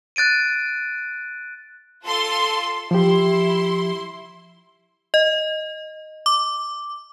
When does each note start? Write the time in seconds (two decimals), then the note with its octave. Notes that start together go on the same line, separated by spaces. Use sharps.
0.16 F#6 A6 D7 D#7
2.04 F4 A4 C6
2.91 F3 E4 G4 C6
5.14 D#5
6.26 D6